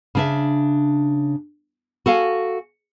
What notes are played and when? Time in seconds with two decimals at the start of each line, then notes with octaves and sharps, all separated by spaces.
0.15 C#3 D4 E5
2.06 F#4 A4 F5 G#5